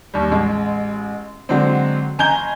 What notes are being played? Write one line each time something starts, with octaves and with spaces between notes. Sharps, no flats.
D#2 G3
A1 G#3
D3 F#3 G#3 C4
F#1 G#5 A#5 G6 G7